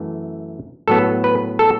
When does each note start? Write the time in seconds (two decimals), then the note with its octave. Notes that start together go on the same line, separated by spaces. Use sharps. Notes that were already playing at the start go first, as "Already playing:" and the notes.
Already playing: F#2 E3 A3
0.88 A2 F#3 B3 A4
1.24 B4
1.59 A4